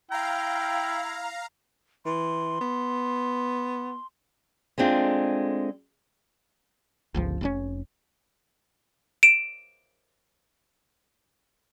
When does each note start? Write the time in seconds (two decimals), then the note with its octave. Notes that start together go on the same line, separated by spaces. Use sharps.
0.11 E4 F5 G5 A#5
2.06 E3 C6
2.61 B3
4.78 G#3 A3 C4 D4 F4
7.14 G1 C#2 F3
7.41 F1 A#2 C#4
9.23 D7 E7